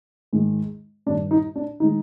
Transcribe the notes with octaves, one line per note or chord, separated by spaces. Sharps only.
G#2 D#3 G#3
G2 D#3 G3 D4
D#4
D4
D#3 G#3 D#4